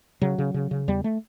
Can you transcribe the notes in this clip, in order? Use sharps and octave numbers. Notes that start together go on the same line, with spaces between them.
C#3 F#3
C#3
C#3
C#3
E2 G3
A3